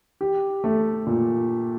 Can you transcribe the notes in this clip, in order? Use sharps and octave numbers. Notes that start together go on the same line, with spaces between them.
G4
A3
A#2